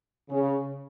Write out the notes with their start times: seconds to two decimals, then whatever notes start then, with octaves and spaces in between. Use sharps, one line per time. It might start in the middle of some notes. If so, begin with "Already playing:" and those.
0.30 C#3